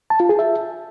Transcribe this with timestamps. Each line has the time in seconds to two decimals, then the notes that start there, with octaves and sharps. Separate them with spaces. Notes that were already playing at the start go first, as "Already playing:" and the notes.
0.10 A5
0.20 F4
0.29 G#4
0.39 E5